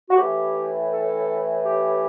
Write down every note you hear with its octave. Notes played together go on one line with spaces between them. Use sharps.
F#4
A2 E3 G4
A4
G4